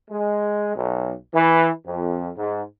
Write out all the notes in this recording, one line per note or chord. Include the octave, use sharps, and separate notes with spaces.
G#3
B1
E3
F2
G#2